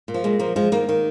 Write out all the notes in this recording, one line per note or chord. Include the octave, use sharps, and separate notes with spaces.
A#2
F3
A#2 G#3
F3 A#3
F3 G#3
D#3 A#3
D#3